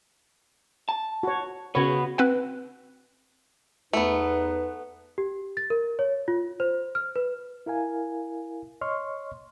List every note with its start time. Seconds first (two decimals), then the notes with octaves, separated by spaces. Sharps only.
0.89 A5
1.23 F#4 C#5
1.75 C#3 B3 F#4 C#5
2.18 C4 B4 F#5
3.93 E2 A3 B3 D#4 B4
5.18 G4
5.57 A6
5.70 A#4
5.99 C#5
6.28 F4
6.60 C5
6.95 F6
7.16 B4
7.66 E4 A#4 F5 G#5
8.81 C#5 D#5 C6 C#6 F6